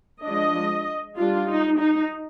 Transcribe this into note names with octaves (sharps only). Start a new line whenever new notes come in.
F3 G#3 D4 D#5
G3 D4 F4
D#4
D#4